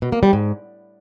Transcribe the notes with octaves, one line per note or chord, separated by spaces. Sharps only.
B2
A#3
G3
G#2